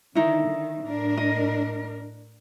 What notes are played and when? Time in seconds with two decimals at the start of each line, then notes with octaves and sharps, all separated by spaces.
0.15 D3 D#3 D#4 E4
0.47 D#3
0.87 A2 D4 A#4
1.17 D#5